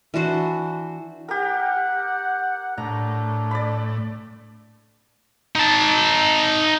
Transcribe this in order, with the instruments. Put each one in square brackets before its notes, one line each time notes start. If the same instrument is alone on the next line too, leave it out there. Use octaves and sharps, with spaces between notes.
[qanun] E3 D4 F#4 C5
[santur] G4 A#4 [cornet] F#5
[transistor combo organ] A2 [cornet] D4 [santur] A#5
[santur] D5 B5
[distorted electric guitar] D#4 A5